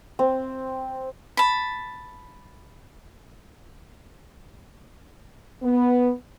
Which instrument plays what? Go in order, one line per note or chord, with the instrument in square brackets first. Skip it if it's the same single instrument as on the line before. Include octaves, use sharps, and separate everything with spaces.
[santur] C4
[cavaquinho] A5 B5
[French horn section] B3